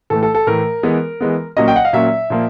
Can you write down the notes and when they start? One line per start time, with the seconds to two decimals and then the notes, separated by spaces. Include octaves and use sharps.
0.10 A2 E3 A3 A4
0.23 A4
0.35 A4
0.47 A2 E3 A3 A#4
0.83 E3 G#3 B3
1.21 E3 G#3 B3
1.56 A#2 F#3 A#3 C#4 D#5
1.68 G5
1.76 F#5
1.85 F5
1.93 A#2 F#3 A#3 C#4 E5
2.30 A#2 F3 A#3